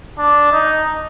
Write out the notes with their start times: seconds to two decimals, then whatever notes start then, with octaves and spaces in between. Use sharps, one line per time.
0.18 D4
0.52 D#4